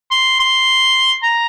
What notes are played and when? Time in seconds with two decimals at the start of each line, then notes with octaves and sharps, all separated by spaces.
0.11 C6
0.39 C6
1.23 A#5